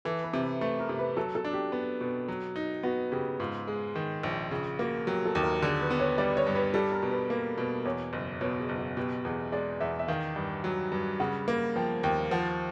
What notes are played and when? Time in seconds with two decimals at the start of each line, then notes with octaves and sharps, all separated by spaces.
0.05 E3 A4
0.24 B4
0.34 C3
0.42 B4
0.61 A3 B4
0.80 A#4
0.89 C3
0.99 B4
1.16 F#3 A4
1.35 A4
1.45 D4
1.53 G4
1.72 B3
2.01 B2
2.28 F#3
2.56 D#4
2.83 B3 F#4
3.12 C#3 G4
3.39 G#2 F4
3.67 G#3
3.96 D#3
4.23 A#1
4.51 C#3 F4
4.79 A#3 F#4
5.07 F#3 G4
5.25 A4
5.35 D#2
5.44 A#4
5.62 D3 G#4
5.81 B4
5.90 B3
6.00 C#5
6.18 G3 D5
6.37 C#5
6.47 G2
6.55 B4
6.74 G3 A4
6.92 A#4
7.02 B2
7.11 B4
7.30 A#3
7.58 B2
7.85 E2 C#5
8.13 F#1
8.41 B2 C#5
8.60 G#4
8.69 F#1
8.78 F#4
8.97 B2 G4
9.25 E2 G#4
9.52 G#3 D5
9.80 E2 E5
9.99 E5
10.08 D#3 F5
10.36 G2
10.64 F#3
10.92 G2
11.20 C#3 F#5
11.48 A#3
11.76 F3 G5
12.03 D#2 G5
12.31 F3 F#5